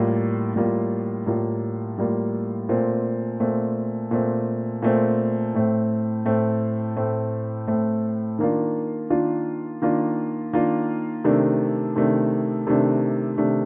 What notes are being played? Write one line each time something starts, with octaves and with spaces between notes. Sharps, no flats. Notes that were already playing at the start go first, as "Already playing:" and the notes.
Already playing: A2 G3 A#3 F4
A2 G3 A#3 F4
A2 G3 A#3 F4
A2 G3 A#3 F4
A#2 A3 C4
A#2 A3 C4
A#2 A3 C4
A#2 A3 C4
A2 A3 C4
A2 A3 C4
A2 A3 C4
A2 A3 C4
D#3 A#3 D4 F4
D#3 A#3 D4 F4
D#3 A#3 D4 F4
D#3 A#3 D4 F4
C3 D#3 A3 D4
C3 D#3 A3 D4
C3 D#3 A3 D4
C3 D#3 A3 D4